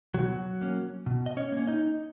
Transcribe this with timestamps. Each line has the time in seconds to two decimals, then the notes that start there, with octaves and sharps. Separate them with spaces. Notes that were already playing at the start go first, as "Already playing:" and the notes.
0.14 B2 F#3 F#4
0.61 A#3 C#4
1.06 B2
1.26 D#5
1.37 C#4 C#5
1.52 A#3 C#4
1.67 D#4 D#5